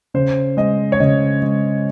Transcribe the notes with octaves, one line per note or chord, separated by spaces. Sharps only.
C#3 C5
G#3 D#5
C#5
C#3 D#5
G#3